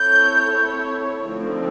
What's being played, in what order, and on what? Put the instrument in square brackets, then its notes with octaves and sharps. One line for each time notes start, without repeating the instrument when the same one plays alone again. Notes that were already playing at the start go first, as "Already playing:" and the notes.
Already playing: [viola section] C4 E4 A4 C#5 [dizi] G6
[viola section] D3 F3 A3 C4 D#4